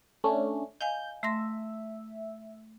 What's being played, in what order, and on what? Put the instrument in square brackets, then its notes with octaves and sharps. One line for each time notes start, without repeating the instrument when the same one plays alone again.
[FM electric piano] A3 C#4 D4
[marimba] D#5 F5 G#5 [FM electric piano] G6
[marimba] A3 C6 A#6 [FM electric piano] E5